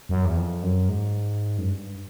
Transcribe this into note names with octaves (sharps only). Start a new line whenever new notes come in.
F#2
E2
F2
F#2
G#2
F#2
G2